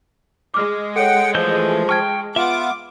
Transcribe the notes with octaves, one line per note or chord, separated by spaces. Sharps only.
G#3 D6 F6
A4 C#5 F#5 G5
E3 F3 A3 G6
G5 A5 C#6 F6 G#6
B3 F4 E5 F#5 D6